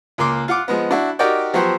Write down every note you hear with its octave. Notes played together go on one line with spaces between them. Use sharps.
C#2 A#3 C6 D6
F4 F#5 D6
F3 G#3 B3
D4 E4 F#4
D#4 F#4 G4 A#4 D5 G5
F3 F#3 B3 F#4 G4 C5